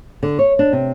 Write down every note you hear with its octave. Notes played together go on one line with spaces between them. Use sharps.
D3
C#5
D4
C3